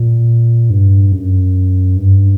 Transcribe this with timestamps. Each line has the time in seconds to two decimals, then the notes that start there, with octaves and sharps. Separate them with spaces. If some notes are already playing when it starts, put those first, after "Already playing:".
Already playing: A#2
0.70 G2
1.12 F#2
1.97 G2